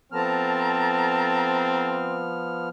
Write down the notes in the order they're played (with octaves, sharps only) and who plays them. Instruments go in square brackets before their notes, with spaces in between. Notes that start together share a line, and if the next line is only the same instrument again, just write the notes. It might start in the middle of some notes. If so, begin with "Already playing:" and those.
[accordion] F3 B3 F6 [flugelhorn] C4 [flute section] A4 A5 A#5